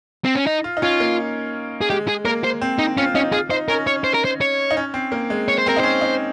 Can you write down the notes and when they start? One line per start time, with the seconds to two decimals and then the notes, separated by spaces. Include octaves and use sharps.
0.25 C4
0.36 C#4
0.47 D#4
0.64 F4
0.77 D#4
0.82 C#4 F4
1.00 A#3
1.81 G#4
1.90 G#3 G4
2.08 G#4
2.25 A#3 A#4
2.44 C5
2.61 C4
2.79 D#4
2.98 C#4 F4
3.15 C#4 D#4
3.32 F4 G#4
3.50 D#4 C5
3.69 C#4 A#4
3.87 C#4 C#5
4.04 C5
4.14 A#4
4.25 C5
4.41 C#5
4.71 D#4
4.77 C#4
4.94 C4
5.12 A#3
5.30 G#3
5.48 C#5
5.58 C5
5.66 C4
5.69 A#4
5.76 D#4
5.80 C#4 C5
6.01 D#4